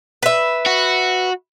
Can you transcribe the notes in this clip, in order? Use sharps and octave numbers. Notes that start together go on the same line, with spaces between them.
B4 E5
F#4